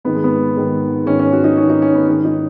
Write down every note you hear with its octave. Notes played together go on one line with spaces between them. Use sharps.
G#2 D#3 B3
G#3
B3
G#2 D#3
G#2 D#3 C#4
C#4
F#4
D#4
G#2 D#3 C#4
D#4
C#4
B3
G#2 D#3 C#4
D#4